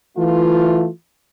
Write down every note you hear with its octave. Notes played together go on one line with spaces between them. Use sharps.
E3 A3 F4